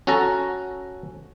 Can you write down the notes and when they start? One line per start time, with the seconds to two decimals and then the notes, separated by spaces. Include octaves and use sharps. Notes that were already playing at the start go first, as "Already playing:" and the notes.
0.07 C#4 F#4 A4 A#5